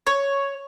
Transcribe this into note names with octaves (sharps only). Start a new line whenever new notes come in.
C#5